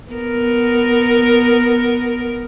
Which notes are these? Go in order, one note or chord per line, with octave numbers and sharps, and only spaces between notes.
B3 A#4